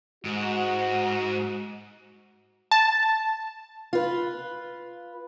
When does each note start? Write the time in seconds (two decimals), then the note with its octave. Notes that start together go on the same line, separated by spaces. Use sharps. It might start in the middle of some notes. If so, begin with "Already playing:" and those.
0.25 G#2 F#4
2.71 A5
3.93 F4 B4